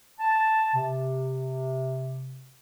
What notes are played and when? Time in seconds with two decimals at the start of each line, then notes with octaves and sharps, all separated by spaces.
0.20 A5
0.74 C3